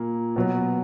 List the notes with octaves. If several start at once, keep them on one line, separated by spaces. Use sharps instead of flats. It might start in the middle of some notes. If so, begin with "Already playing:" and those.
Already playing: A#2 A#3
B2 F#3 B3